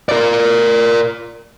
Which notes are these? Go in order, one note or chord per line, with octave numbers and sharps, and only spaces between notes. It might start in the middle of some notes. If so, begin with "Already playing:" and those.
A#4 D5